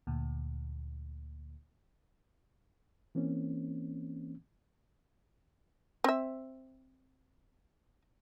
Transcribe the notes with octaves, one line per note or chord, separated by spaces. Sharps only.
D2 A#2
E3 A#3 C4 C#4
C4 E5